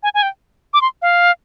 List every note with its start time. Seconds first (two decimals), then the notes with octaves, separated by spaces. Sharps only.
0.03 G#5
0.14 G#5
0.23 G5
0.74 D6
0.81 C6
1.02 F5